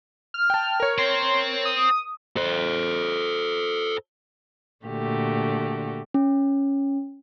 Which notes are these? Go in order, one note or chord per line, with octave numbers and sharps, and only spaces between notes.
F6
G5 A5
A#4 C#5
C5 G5 C6
D#6
A4 C5
A#2 D3 A3 F#4 G4
C#4